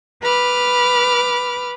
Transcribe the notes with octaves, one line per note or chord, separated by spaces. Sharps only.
B4 B5 D6 F6